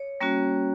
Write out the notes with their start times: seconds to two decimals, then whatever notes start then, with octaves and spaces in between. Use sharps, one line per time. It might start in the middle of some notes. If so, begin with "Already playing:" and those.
Already playing: C#5
0.21 G3 A#3 C#4 F#4